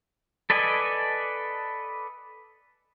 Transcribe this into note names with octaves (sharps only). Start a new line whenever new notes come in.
A4 B4 D5 D#5 G#5